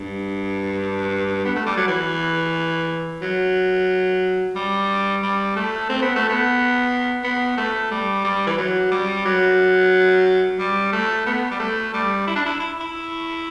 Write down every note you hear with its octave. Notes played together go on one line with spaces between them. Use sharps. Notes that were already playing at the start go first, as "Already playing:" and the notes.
Already playing: G2
B3
A3
G3
F#3
E3
F#3
G3
G3
A3
C4
B3
A3
B3
B3
A3
G3
G3
E3
F#3
G3
F#3
G3
A3
B3
G3
A3
G3
E4
D4
E4
E4
E4